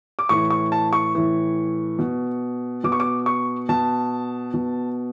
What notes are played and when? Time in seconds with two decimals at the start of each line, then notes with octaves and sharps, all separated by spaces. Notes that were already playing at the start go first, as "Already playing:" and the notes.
0.19 D6
0.29 A2 E3 C#6
0.50 C#6
0.72 A5
0.93 C#6
1.15 A2 E3
1.99 B2
2.84 B2 D6
2.92 C#6
3.00 D6
3.26 C#6
3.69 B2 A5
4.54 B2